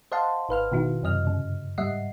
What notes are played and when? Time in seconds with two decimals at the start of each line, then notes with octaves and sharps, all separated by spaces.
0.12 C5 D#5 F5 F#5 A5 C6
0.49 G#1 B4 F5 F6
0.72 B2 D#3 E4 F#4
1.03 F#2 C3 D#5 F6
1.25 G2 C#3
1.78 G#2 G3 D#5 E5 F#5 C7